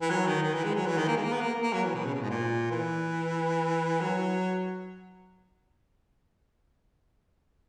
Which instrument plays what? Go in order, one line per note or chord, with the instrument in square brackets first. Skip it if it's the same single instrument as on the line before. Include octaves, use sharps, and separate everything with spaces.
[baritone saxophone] E3
F#3
D#3
D#3
E3
G#3
F#3
E3
D#3
A#3
G#3
A#3
B3
A#3
A#3
F#3
E3
B2
C#3
B2
G#2
A#2
E3
F#3